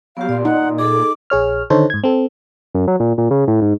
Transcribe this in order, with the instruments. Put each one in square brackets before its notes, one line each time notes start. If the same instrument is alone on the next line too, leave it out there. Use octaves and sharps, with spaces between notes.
[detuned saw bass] F#3 [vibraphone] B3 G4 [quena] F5
[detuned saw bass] A#2 [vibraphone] D5 C6
[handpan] D#4 [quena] F#5
[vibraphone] G#4 A4 [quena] D6
[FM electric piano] A#1 G#4 C#5 F6
D3 D#3 D#4 A4 C5 C#5
G#2 G#6
C4 A4
[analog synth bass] F#2
F#3
A#2
A#2
C#3
A2
G#2